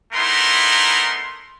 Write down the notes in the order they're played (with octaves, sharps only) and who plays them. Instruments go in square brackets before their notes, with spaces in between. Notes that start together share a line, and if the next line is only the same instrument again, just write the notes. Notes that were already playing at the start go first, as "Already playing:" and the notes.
[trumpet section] A3 B3 D#4 E4 A#4 C6